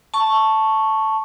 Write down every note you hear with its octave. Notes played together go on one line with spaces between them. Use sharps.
A5 C#6